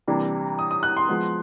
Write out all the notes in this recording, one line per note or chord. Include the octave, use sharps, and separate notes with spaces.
C3 E3 G3 A#3 D4
D#6
D#6
F#6
C6
F3 G#3 B3